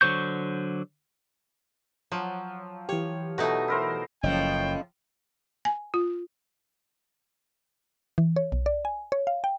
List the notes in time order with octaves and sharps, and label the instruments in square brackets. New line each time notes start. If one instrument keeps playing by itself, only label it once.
[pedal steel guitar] D3 F#3 C5 C#6 G6
[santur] F3 [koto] F#3
[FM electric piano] E3 G4 [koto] C#5
[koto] B2 A3 D#4 [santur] F#4
[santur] E4 A#4 C5
[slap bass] F#1 [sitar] A2 F3 [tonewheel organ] C#4 D#5 [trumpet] G5
[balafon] G#5
F4
[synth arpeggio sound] E3
C#5
B1
D5
G#5
C#5
F5
G5